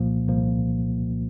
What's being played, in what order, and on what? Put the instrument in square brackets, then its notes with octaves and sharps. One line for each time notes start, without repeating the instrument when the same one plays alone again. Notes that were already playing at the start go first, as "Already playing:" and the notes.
Already playing: [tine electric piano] C2 A#2 F3 A#3
C2 A#2 F3 A#3